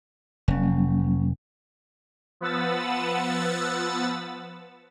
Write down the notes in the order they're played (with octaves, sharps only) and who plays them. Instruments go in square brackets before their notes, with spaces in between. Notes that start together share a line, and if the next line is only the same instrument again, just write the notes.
[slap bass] F1 [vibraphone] F#3 A#3 C#4
[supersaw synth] F3 B3 B4 F#5 E6 A6